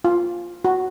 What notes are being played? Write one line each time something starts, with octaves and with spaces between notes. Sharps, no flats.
F4
F#4